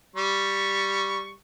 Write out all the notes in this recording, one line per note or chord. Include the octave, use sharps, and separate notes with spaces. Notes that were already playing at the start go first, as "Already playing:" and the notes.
G3 C#6